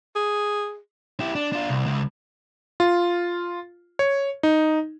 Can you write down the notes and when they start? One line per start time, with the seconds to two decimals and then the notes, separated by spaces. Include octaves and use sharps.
0.16 G#4
1.20 E4 G4
1.35 D4
1.52 D4 F4
1.69 C2
1.86 C#2
2.80 F4
3.99 C#5
4.43 D#4